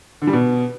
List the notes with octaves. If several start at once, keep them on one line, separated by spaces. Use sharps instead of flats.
D3
G3
B2